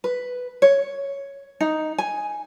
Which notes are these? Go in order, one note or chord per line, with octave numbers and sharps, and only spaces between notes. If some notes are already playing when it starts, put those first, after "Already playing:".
B4
C#5
D#4
G#5